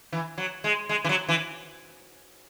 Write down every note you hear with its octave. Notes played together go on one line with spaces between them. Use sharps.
E3
F#3
G#3
G#3
E3
F#3
E3